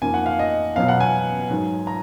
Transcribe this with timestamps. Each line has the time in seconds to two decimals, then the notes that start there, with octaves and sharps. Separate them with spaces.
0.02 F2 D#3 A#3 G#5
0.14 F#5
0.26 F5
0.39 D#5
0.76 B2 F#3 B3 F5
0.88 F#5
1.00 G#5
1.50 G#2 D#3 F#3
1.87 A#5